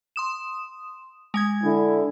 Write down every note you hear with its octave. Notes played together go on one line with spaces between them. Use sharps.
C6 D#6 E7
G#3 G#5 G#6
D3 E4